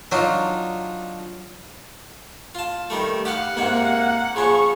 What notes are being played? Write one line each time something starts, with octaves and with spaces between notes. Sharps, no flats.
F#3 D4 D#4 F4
F4 A5
D#3 G3 A3
G4 F5 F#5
G#2 C3 A#3 C4
C#3 F3 C#4 G#4 C#6